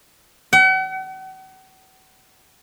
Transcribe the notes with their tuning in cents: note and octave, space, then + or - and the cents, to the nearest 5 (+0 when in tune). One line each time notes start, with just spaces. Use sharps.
F#5 +40